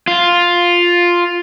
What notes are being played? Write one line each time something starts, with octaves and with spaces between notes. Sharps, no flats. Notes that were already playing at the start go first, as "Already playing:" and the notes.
F4